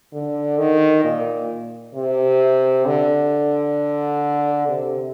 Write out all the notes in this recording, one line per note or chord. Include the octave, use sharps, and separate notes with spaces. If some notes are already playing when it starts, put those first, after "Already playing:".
D3
D#3
A#2
C3
D3
C3